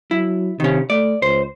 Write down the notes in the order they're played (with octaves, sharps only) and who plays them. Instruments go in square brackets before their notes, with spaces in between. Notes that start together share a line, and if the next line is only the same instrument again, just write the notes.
[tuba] F#3 [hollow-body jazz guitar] E4
[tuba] C3 [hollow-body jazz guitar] D#3 C#4
[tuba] A3 [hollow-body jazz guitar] D5
[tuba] C#2 [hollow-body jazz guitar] C5